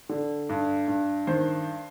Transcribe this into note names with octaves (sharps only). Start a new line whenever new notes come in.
D3
G2
G2
D#3 C5